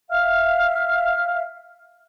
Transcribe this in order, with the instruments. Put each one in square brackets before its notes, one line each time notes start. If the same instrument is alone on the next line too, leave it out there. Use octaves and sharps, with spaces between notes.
[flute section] E5 F5 F6